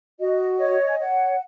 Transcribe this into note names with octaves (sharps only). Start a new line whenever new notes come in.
F#4 D#5
C#5
G#5
C#5 F#5